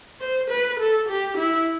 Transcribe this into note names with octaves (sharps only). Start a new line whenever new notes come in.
C5
B4
A4
G4
E4